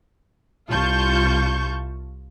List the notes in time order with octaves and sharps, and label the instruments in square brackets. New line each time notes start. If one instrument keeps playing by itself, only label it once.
[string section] C2 F4 A5 C#6 G6